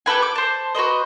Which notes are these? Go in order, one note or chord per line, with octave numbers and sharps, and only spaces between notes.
G4 A4 B4 G#5
D6
C5 A5
F#4 B4 C5 D#5